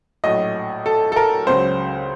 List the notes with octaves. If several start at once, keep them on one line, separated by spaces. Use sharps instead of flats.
A#1 A2 F#3 D#5
A4
A4
A#4
C#2 C#3 F#3 C5